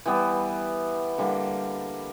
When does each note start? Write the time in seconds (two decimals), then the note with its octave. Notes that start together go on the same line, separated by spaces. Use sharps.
0.06 E3 G3 B3
1.18 D3 G3 A#3